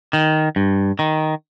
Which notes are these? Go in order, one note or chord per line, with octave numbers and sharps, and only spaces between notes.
D#3
G2
D#3